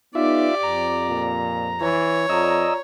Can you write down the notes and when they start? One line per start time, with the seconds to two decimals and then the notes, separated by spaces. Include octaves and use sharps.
0.15 B3 D#4 F4 G4 D5 E5
0.63 F2 A#5
1.09 A#2
1.81 E3 C#5
2.29 F2 F4 D5 D#5 A#5 E6